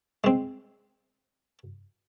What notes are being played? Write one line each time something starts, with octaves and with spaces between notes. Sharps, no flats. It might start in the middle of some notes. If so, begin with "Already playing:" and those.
G#3 C4